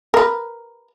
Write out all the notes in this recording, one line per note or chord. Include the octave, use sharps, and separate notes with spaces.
A#4 B4